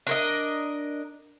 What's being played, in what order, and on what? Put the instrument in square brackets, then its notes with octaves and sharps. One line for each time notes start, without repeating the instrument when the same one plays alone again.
[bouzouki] D4 A#4 D#5